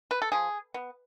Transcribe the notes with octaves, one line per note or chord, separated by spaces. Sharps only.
B4
A4
F3 G#4
B3